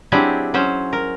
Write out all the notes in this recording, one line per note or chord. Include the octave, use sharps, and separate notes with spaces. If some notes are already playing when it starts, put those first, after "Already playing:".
F#3 C4 D4 E4 G4 G#4
F#3 C#4 C5
A#4